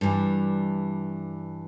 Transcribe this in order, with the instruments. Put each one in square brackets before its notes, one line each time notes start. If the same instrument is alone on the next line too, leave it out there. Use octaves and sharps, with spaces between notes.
[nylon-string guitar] G2 E3 G3